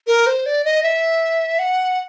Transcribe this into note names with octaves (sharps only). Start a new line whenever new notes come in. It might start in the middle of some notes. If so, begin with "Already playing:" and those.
A#4
C5
D5
D#5
E5
F#5